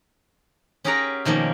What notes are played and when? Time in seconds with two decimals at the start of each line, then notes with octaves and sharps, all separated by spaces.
0.84 C#4 G4 G#4 A#4 F#5 A#5
1.25 B2 D#3 F3 A#3 C#4